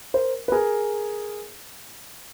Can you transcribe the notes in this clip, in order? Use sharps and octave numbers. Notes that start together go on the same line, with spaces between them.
A#4 C5
B4
G#4 A#4